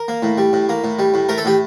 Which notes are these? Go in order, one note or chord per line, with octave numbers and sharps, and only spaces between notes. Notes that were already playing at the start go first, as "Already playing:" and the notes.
Already playing: A#4
A#3
A2
G3
A2
A#3
A2
G3
A2
A3 A#4
A4
A2 G4